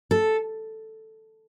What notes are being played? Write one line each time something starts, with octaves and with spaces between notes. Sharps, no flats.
A4